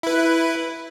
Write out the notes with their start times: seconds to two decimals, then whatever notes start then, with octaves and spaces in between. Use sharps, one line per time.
0.03 E4 B4